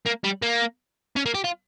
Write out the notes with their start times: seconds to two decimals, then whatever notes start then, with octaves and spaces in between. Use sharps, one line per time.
0.06 A#3
0.24 G3
0.42 A#3
1.17 C#4
1.26 A#3
1.35 G4
1.44 F4